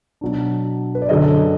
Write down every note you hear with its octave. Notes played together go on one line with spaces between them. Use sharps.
B2 F#3 D4
B4
D5
F#2 D3 F#3 D#5